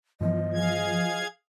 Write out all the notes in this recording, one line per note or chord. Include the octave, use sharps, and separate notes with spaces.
G2 E3 F3 B3 D#5
G#4 F5 G#6